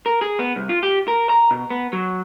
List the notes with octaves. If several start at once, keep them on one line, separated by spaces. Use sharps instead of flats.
A#4
G#4
B3
C2
F4
G4
A#4
A#5
B2
B3
F#3